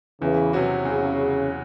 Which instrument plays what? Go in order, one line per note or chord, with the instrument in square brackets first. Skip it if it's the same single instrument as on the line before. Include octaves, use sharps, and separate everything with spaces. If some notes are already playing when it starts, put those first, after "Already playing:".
[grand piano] E2 [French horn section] C#3 E3
[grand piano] C3 F#3 C#4 F#4
[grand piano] E2 [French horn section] C#3